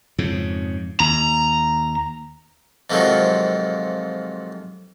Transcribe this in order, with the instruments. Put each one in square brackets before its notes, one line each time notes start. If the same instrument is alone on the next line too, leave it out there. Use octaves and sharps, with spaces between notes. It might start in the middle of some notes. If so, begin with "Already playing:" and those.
[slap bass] F2 G#2 C#3
[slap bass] D#2 [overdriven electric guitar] A#5
[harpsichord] F2 G#2 C3 D#3 F3 F#3